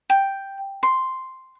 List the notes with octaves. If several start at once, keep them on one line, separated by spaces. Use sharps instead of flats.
G5
C6